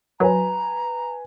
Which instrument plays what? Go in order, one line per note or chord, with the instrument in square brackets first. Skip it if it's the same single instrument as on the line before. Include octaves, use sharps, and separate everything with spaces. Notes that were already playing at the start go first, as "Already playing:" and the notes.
[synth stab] F#3 [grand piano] B4 G#5 [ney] A#5